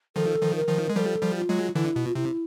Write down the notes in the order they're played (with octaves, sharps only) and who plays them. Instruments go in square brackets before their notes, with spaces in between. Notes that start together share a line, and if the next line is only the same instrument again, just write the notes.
[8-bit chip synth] D#3 F3 [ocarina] A4
[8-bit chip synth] D#3 F3
[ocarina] A#4
[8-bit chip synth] D#3 F3
G#3
[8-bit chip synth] F3 G3 [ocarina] A4 A#4
[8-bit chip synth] F3 G3
[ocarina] F4
[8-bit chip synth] F#3 G#3
[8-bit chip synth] D3 E3 [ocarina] E4
[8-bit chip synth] B2
[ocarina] F4
[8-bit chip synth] C3 [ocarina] E4